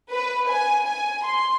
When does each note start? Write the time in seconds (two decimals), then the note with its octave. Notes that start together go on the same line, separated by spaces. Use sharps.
0.11 B4
0.48 G#5
0.87 G#5
1.25 C6